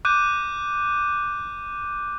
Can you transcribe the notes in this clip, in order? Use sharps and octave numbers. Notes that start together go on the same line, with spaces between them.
D6 F#6 G6 D#7